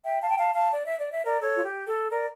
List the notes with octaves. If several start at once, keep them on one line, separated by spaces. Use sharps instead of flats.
E5 G5
F5 A5
G5
F5 A5
F5 A5
D5
E5
D5
E5
A#4 D5
A4 C#5
F4
G4
A4
A#4 D5